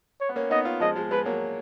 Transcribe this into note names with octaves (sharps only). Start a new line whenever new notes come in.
C#5
B3
A#3 C#4
B3 D#4 D#5
C#4 F4
F3 G#3 D#5
F3 G#3
F3 G#3 B4
F#3 A#3